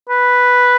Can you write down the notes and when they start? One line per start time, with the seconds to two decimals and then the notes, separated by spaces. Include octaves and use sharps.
0.09 B4